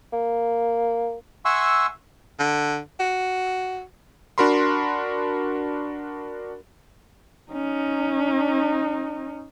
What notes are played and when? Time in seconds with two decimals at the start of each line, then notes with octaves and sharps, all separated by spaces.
0.13 A#3
1.45 E5 F#5 G#5 C6 C#6 E6
2.39 D3
3.00 F#4
4.38 D4 F#4 A#4 B5 C6
7.52 C#4 D#4